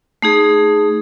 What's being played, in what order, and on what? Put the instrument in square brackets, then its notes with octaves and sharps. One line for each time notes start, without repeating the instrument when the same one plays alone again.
[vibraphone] A3 D#4 G#4